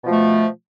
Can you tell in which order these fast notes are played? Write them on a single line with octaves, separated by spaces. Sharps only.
B2 F3 A3